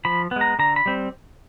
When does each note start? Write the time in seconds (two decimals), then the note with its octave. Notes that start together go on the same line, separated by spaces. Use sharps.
0.05 F3 B5
0.31 G#3 B3
0.41 A#5
0.59 D3 A#5
0.76 B5
0.86 G3 C4